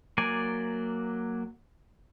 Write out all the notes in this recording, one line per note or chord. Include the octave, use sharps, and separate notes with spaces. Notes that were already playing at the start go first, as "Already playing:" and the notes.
F#3 A#3 D5 G#5